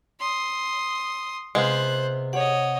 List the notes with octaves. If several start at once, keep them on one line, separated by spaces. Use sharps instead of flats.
C6 D#6
C3 G#3 B3 F4 C5 F#6
G4 C#5 D#5 F#5